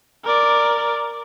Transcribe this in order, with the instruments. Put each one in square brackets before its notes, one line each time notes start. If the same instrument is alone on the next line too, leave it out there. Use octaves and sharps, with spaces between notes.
[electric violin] A#4 D5